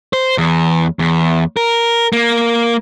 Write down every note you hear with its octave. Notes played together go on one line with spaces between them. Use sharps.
C5
E2
E2
A#4
A#3